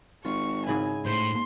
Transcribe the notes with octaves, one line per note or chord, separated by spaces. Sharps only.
G#1 F4 C#6
G#2 C#3 E4 G#5
A2 C5 C6